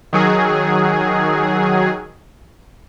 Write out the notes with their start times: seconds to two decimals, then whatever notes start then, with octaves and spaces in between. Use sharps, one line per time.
0.13 D#3 F#3 G#4